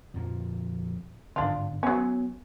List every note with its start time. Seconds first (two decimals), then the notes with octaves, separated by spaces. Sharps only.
0.14 F2 A#2 F3
1.36 G#1 G2 D3 D4 F4
1.83 F#3 B3 C#4